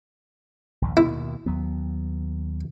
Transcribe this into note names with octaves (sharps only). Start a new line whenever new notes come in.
A#1 D#2 G#2
D#2 B2 D#3 E4
D#2 F#3 B3